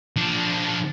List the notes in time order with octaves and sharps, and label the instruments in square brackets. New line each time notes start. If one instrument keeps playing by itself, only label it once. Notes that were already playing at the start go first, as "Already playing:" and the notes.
[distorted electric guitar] F3 D4